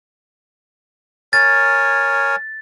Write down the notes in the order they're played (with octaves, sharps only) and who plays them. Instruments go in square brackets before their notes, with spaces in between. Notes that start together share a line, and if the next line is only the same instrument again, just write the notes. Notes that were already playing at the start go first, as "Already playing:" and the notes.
[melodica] A#4 C#5 G#5 [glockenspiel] A6